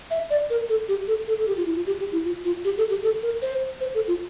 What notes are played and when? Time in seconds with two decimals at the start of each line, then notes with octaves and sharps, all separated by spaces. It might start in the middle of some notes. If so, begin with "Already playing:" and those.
0.11 E5
0.30 D5
0.50 A#4
0.69 A4
0.88 G4
1.08 A4
1.27 A4
1.39 A4
1.48 G4
1.57 F4
1.66 E4
1.76 F4
1.87 G4
1.99 G4
2.12 E4
2.24 F4
2.45 F4
2.65 G4
2.78 A4
2.90 G4
3.03 A4
3.23 A#4
3.42 C5
3.81 C5
3.95 A4
4.08 F4